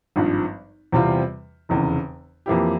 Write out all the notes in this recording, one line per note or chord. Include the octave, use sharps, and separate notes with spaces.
G#1 G2 F3
E2 C3 G3 C4 F4
F1 E2 C#3
F2 E3 A#3 E4 G4